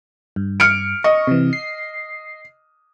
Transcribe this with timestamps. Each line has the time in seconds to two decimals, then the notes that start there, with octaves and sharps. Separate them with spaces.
0.36 G2
0.60 F6 C#7 D7
1.04 D#5 C#6
1.27 C3 E3
1.53 C7